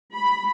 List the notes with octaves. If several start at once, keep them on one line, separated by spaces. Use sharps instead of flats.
B5